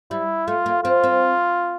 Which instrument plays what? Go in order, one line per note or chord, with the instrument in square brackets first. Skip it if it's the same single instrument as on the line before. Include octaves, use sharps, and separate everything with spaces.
[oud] G3 [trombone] E4
[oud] A3 [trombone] F4
[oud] A#3
[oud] C4 [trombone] F4
[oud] C4